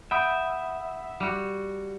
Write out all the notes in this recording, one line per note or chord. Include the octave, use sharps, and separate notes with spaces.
E5 F#5 G5 B5 D#6
G3 F#4